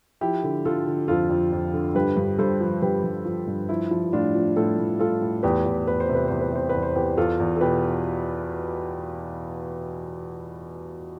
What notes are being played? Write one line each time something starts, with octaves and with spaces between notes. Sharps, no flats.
F3 E4 G4
D3
D3 F4 A4
D3
F2 F4 A4
F2
F2
D3
G2 G4 B4
G2
G2 A4 C5
F3
G2 G4 B4
G2
F3
G2
F3 E4
F3
A2 D4 F4
F3
A2 F4 A4
A2
A2 F4 A4
A2
E2 G4 B4
E2
E2 B4
C5
C3
B4
E2 C5
B4
C3 C5
E2 B4
C5
E2 G4 B4
E2 F4 A4
E2
A4
B2 G4 B4